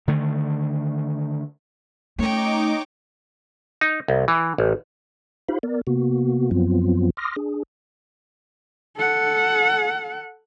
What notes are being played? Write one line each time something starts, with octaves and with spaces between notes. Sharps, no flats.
D3 D#3 A3
A3 C#4 D#4 C#5 G5 D6
D#4
C2
E3
A1
D#4 F4 G4 C5 F5 B5
B3 A#4 D5
C3 A#3 B3 F#4
F#2 F3 F#3 B3 C4 F4
C6 D6 D#6 F6 A#6
D4 G#4
A4 F#5